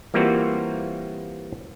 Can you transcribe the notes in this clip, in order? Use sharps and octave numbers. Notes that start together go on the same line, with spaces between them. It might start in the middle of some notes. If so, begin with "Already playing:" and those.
E3 G3 A#3 C4 F4 F#4